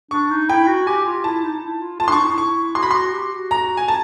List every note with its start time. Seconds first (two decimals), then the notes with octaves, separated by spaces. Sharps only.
0.11 D4 C#6
0.31 D#4
0.49 E4 G5
0.67 F#4
0.87 G4 G#5
1.06 F4
1.24 E4 A5
1.43 D#4
1.63 E4
1.81 F4
2.00 F4 A5
2.08 D4 C6 C#6
2.18 D#4
2.28 E4
2.38 C#6
2.75 F#4 C6
2.83 B5
2.91 F#4 C6
3.13 G4
3.32 F#4
3.51 A#5
3.77 G#5
3.88 A5